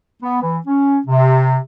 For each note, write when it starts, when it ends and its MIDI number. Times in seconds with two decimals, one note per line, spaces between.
0.22 0.39 59
0.42 0.58 52
0.67 0.99 61
1.07 1.59 48